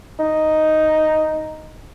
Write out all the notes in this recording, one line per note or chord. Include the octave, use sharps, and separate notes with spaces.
D#4